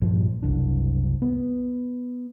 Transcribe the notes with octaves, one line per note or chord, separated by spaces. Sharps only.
A#1 G2 A#2 F3
F#1 C2 D4
B3